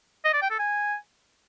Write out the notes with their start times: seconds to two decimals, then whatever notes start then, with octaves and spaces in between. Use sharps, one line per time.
0.25 D#5
0.33 D5
0.42 G5
0.50 A4
0.59 G#5